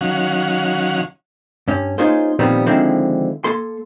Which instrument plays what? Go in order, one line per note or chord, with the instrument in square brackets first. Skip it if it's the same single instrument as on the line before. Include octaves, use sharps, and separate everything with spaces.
[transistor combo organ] D#3 F#3 C#4 F5 F#5
[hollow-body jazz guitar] G2 C#4
A#3 C#4 D#4 F4 G#4 C5
A#2 D#3 F3 G3 B3 C4
D3 D#3 F3 G#3 C4 E4
A#3 A4 C6